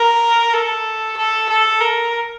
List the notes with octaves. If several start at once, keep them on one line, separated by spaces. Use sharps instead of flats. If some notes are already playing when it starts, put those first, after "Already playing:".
Already playing: A#4
A4
A4
A4
A#4